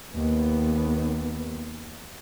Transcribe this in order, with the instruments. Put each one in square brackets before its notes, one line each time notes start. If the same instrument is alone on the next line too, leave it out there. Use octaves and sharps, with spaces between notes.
[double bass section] D#2 B3